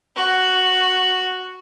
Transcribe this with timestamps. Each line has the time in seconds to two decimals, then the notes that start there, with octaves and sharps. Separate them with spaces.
0.16 F#4